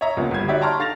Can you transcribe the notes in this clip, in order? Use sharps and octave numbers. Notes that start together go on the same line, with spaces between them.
C#5 D#5 E5 A#5
C#2 A#2 C#3 F3 A#3 B3
G1 G3 G#6
D#4 F#4 G4 C#5 D5 E5
G5 A5 A#5 C6 C#6 F6
D3 F5 A6 A#6 F7